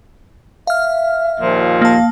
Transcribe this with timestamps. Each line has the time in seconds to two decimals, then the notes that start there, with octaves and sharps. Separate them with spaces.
0.67 E5 F5 F6
1.41 D#2 A#2 F3
1.82 A#3 F5 A5